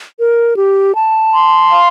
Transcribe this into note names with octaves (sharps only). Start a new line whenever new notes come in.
A#4
G4
A5
C6
F5